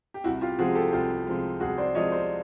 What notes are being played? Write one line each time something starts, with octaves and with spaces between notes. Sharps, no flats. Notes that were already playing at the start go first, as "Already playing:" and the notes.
G4
C2 E4 F#4
F4 G4
C3 F3 G#3 F#4 G#4
G4 A4
C2 F4 G4
C3 F3 G#3
C2 F#4 G#4
C5 D5
C3 F3 G#3 C#5 D#5
C5 D5